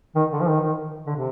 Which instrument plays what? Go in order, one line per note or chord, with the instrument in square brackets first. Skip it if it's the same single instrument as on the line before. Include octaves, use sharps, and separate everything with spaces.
[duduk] D#3
D3
F3
D#3
D#3
D3
C3